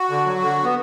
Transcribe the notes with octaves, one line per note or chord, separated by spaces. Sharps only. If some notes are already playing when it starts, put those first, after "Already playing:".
Already playing: F#4
D3
F#3
D3
B3